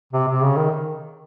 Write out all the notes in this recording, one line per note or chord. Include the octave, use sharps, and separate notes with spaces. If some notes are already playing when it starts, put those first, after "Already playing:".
C3
C3
C#3
D#3